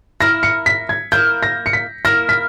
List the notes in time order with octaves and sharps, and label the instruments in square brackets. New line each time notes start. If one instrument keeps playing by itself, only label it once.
[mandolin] A#3 E4 A#4 [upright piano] A#6
[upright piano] C#7
B6
G#6
[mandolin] A#3 E4 A#4 [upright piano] G6
[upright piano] A#6
C#7
B6
[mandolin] A#3 E4 A#4 [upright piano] A#6
[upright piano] B6